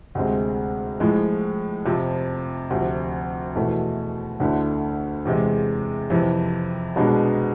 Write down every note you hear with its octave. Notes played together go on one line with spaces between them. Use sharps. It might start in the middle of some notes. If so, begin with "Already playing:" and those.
D2 C3 G#3 C4
A2 F3 G#3
F2 C3 F3
D2 C3 F3
E2 B2 A3 E4
D2 D3 A3 E4
E2 C3 G#3
F2 C3 E3
C2 B2 G#3 B3 D4